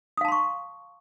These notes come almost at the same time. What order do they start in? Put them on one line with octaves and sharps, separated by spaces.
D#6 F5 A5 C6 C#6